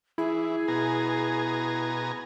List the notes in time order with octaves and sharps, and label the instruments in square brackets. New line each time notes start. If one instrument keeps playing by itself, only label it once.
[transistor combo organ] E3 [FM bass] E4 [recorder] G#4
[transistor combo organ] B2 G#5 A#5